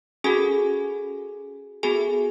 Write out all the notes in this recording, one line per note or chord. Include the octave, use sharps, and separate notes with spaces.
C#4 F#4 G#4 A4 G#5
B3 F#4 G#4 A4 G#5